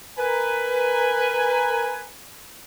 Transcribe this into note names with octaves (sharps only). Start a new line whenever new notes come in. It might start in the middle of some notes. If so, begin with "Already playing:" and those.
A#4 B4 G#5